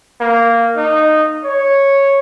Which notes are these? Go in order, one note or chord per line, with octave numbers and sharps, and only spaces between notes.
A#3
D#4
C#5